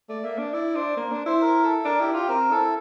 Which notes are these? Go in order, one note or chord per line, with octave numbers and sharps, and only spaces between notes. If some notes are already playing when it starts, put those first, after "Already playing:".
A3 D5
A#3 E5
D4
E4 D5
D4 C5
A#3 A#4
D4 C5
E4 C5
A#4
A4
D4 A#4
E4 G4
F4 G4
C4 A#4
E4 A4